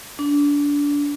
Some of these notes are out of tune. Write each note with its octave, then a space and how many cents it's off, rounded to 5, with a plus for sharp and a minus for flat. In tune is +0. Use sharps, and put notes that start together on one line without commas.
D4 -25